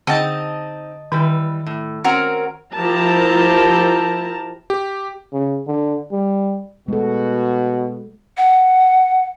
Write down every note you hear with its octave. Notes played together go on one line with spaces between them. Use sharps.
D3 C4 D#4 D#5 F#5 G5 A5
D#3 E3 G3 B4
A2
C4 C#4 F#4 A#4
F3 E4 G4 A#4 A5 A#5
G4
C#3
D3
G3
B2 G#3 F#4 A4
F#5